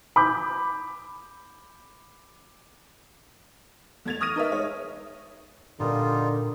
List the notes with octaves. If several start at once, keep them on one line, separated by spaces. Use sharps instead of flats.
B5 D6 G6
E2 A3 G#6 A6 F7
C#6 D#6 F6 A#6 D#7
D#4 A#4 B4 E5
G#3 C#5
A#2 D3 G3 D4 D#4 F4 A#4